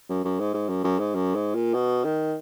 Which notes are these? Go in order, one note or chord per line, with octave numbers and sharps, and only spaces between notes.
F#2
F#2
G#2
G#2
F#2
F#2
G#2
F#2
G#2
A#2
B2
D#3